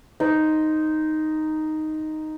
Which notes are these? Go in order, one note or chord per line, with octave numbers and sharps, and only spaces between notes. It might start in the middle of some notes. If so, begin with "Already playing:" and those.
D#4 C5